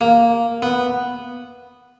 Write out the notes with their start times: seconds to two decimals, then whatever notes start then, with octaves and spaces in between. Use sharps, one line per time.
0.01 A#3
0.62 B3